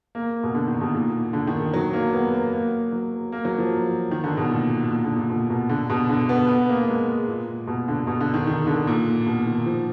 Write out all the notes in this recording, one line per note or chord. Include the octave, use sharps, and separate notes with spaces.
A#3
B2
D3
D#3
B2
A#2
D3
D#3
F#3
A#3
B3
A#3
A#3
F#3
A#3
F#3
F3
D#3
D3
B2
A#2
A#2
D3
A#2
B2
B2
D3
B2
D3
B3
B3
A#3
G#3
A#2
B2
D3
B2
D3
D#3
D#3
D3
A#2
B2
D#3
F3